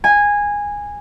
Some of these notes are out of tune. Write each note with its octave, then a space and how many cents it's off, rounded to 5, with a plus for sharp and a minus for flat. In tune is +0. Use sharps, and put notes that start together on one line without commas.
G#5 -15